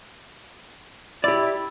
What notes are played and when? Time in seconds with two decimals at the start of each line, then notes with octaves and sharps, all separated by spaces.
1.24 E4 G4 D5